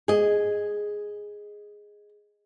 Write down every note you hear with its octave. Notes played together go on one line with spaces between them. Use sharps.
G#4 D#5